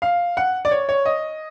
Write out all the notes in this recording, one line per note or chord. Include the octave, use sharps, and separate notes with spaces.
F5
F#5
D5
C#5
C#5
D#5